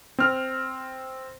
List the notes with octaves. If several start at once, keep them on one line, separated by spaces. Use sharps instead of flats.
C4 F6